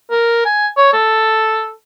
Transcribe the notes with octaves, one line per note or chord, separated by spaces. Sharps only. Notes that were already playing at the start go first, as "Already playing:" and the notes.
A#4
G#5
C#5
A4